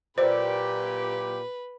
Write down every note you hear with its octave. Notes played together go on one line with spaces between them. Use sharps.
A#2 F#3 E4 G4 B4 C5 D5